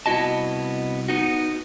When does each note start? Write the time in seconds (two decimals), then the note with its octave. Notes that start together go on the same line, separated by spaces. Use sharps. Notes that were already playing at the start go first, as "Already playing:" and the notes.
0.06 C2 B3 E4 F#4 D#5 A5
1.09 B3 D#4 F#4